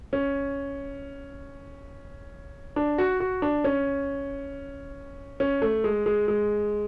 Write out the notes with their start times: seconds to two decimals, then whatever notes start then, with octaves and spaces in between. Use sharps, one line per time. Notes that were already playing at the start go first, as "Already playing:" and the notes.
0.13 C#4
2.76 D4
2.98 F#4
3.20 F#4
3.42 D4
3.64 C#4
5.40 C#4
5.62 A3
5.84 G#3
6.06 G#3
6.28 G#3